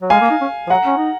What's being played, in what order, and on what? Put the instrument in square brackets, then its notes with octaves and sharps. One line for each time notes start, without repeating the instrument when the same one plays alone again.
[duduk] F#3
[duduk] G#3 [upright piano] F5 G#5
[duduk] A#3
D#4
C#4
F3
[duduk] F#3 [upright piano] F#5 A#5
[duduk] C#4
D#4